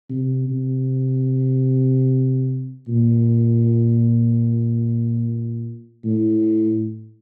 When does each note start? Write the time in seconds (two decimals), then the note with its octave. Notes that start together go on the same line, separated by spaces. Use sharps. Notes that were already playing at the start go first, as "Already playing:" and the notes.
0.10 C3
0.50 C3
2.88 A#2
6.04 A2